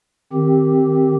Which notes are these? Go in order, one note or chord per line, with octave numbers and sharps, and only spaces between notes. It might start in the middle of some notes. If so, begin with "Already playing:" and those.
D#3 C4 G4